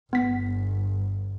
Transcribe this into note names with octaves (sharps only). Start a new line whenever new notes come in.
G1 B3 B6